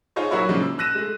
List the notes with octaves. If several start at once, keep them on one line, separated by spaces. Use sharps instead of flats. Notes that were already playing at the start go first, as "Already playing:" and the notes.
D#4 F4 G#4 C5 C#5 D#5
F#3 E4 F#4 A#4 C#5 E5
C#3 F3 G#3 A#3 D4
E6
E6 F#6 A#6 D#7 E7
G#3 A3